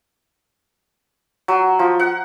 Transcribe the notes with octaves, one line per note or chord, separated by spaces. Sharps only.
F#3
F3
F#5